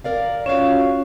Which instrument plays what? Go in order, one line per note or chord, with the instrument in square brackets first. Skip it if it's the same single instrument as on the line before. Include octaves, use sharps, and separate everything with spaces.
[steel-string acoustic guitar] A#4 D5 F5
[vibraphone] C#4 F4 F#4 [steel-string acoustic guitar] C#5 F5